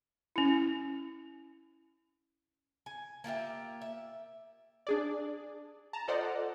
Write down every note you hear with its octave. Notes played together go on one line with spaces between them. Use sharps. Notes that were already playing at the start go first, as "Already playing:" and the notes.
C#4 E4
G#5
A#3 F4 G4 E5
E5
D4 G#4 D5
A5 A#5
F4 A4 C5 D5 D#5 F#5